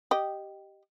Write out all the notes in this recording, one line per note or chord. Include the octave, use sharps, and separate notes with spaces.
G4 D#5